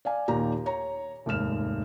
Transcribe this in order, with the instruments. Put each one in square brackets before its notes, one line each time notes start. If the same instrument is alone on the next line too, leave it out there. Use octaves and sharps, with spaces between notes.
[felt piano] D5 F5 G#5
D#2 A#2 D#3 G4 A#5
C#5 A#5
F1 D#2 G#2 F6 E7